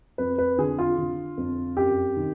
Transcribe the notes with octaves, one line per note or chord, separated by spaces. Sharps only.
F2 B4
B4
D3 G#4
F4
D3
F2
F#2 G4
D#3